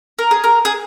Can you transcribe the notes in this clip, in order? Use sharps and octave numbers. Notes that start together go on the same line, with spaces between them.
A#4
G#4
A#4
G#4